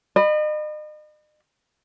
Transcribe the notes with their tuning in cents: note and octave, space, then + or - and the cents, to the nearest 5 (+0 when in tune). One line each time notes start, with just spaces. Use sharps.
D#5 -40 B5 +0